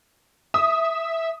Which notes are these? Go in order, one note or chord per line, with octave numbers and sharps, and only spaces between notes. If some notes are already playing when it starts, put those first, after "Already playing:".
E5 D#6